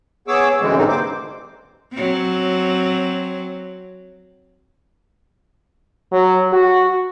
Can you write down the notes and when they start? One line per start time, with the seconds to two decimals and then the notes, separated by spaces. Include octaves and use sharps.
0.28 B3 G#4 C#5 D6 E6
0.61 F#2 B2 D3 E3 G#3 C4
0.77 A2 D3 E3 G3 C4 D#4
0.88 A#3 C5 D6
1.93 F#3 C4
6.12 F#3
6.53 F#4